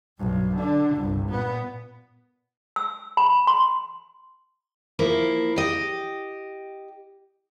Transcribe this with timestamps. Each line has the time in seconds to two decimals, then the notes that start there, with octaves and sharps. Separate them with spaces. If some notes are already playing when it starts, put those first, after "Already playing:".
0.19 B1 G2
0.55 D3 D4
0.97 G1 C2
1.29 A#2 B3
2.76 E6
3.17 B5
3.47 C6
4.99 F3 A#3 E4
5.56 G4 D#5